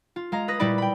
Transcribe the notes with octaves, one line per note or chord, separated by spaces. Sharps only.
F4
G#3 F5 A#5
B4 D#6 A#6
A#2 G3 E4 B4 D5 B5
G5 B5